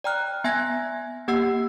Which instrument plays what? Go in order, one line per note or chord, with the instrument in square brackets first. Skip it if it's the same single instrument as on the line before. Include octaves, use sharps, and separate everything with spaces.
[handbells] D5 G5 A#5 F6 F#6
B3 E5 G#5 F#6 G#6 A#6
A#3 G4 F#5 E6 C7